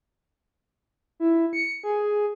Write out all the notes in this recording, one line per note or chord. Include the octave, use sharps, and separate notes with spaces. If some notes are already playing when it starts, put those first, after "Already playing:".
E4
C#7
G#4